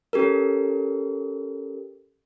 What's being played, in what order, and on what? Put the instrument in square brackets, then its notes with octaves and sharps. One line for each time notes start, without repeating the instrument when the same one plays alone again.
[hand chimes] C#4 G4 A4 A#4